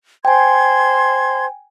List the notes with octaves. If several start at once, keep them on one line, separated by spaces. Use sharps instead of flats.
C5 G5 G#5 C6 G#6